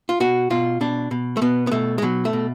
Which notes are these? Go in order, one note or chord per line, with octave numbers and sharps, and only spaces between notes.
F4
B2 F#4
B2 F4
B2 D4
B2
A3
B2 B3
B3
B2 A3
G#3
B2 F#3
A3
B2